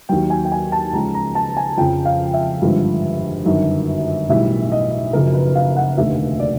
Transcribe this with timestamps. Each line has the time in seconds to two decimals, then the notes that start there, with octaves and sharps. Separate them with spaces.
0.09 D#2 D#3 F#3 G5
0.30 G#5
0.45 G5
0.52 G#5
0.72 A5
0.93 C#2 C#3 F3 A#5
1.14 A#5
1.35 A5
1.57 G#5
1.77 F2 C#3 F3 G5
2.05 F5
2.34 E5
2.61 G#1 G2 D3 F3
3.45 G1 F#2 D#3 F#3
4.29 B1 A2 E3 G3 E5
4.72 D#5
5.13 F#1 F#2 C#3 F3 A#4
5.34 B4
5.55 F5
5.76 F#5
5.97 F1 D#2 D3 E5
6.40 D5